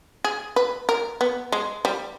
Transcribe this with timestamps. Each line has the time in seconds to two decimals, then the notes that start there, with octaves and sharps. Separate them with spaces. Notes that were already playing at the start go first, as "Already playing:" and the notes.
0.24 G#4
0.56 B4
0.89 A#4
1.21 B3
1.52 G#3
1.85 G3